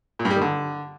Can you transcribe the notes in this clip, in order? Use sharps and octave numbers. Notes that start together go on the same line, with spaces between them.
A#2
G2
G3
D#3
D3